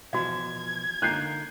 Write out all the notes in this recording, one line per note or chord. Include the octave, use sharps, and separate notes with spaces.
B2 E3 F3 F#4 F5 G#6
D3 A#3 D#4 F#6 G6 C7